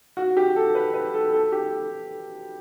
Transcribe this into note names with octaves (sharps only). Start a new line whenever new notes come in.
F#4
G4
A4
B4
B4
A4
A4
G4
A4